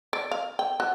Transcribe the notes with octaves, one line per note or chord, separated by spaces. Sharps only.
D5
F5
G5
F#4